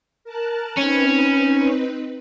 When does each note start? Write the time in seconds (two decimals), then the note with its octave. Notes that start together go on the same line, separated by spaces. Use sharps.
0.24 A#4 A5 F#6
0.78 C4 C#4 D#4 B4